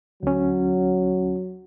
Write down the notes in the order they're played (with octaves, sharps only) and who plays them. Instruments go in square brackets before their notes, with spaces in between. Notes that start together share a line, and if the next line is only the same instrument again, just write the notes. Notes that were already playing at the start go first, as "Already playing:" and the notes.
[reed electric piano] D2 C#4 [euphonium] F#3